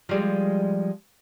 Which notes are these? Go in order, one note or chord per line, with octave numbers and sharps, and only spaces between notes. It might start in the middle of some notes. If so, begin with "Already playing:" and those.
F3 G3 G#3